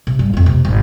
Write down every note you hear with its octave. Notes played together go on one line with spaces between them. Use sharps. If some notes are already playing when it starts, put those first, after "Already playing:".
C3
G2
F2 F4
C3 A#3
G#1